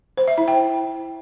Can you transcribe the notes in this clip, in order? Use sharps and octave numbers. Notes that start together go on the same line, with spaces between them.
C5
E5
E4
G5